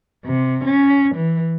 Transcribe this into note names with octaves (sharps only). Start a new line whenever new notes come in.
C3
C#4
E3